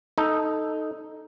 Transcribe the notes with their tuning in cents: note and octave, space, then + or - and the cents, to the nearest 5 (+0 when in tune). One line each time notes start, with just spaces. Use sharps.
D#4 +0 A4 +0